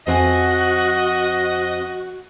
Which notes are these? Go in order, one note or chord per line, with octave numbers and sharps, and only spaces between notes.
F2 C4 F#4 D#5 G#5